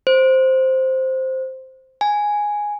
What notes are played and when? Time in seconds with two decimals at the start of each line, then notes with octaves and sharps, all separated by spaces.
0.07 C5
2.01 G#5